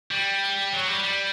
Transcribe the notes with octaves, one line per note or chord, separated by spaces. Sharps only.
G3
F#3
G3
G3